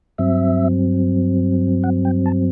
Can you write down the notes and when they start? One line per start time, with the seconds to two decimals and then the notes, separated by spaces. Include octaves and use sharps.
0.18 G2 F#3 C4 E5
1.84 F#5
2.05 G5
2.26 A5